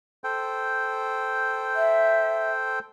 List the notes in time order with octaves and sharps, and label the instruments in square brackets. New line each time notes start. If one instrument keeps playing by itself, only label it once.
[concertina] A4 C5 G5
[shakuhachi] E5